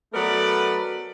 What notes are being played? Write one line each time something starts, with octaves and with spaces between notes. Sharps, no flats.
F#3 A3 B3 A#4 B4 D5